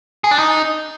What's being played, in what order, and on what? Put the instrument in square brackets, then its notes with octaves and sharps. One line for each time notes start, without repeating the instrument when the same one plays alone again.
[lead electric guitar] G#4
D4
D#4